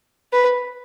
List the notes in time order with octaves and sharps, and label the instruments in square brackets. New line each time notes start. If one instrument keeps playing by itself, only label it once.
[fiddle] B4